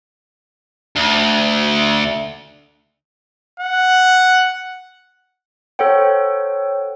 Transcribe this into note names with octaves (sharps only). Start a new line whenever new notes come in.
D2
F#5
A4 C5 C#5 F#5 G5